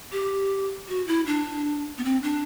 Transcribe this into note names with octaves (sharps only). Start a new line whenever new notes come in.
G4
F#4
E4
D4
B3
C4
D4